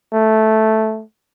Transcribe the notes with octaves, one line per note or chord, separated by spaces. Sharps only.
A3